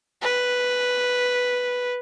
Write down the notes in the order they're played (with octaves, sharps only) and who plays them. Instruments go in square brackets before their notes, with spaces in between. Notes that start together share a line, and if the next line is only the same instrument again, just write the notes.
[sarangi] B4